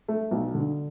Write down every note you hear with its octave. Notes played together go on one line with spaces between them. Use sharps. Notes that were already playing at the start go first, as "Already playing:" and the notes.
A3
B1
D3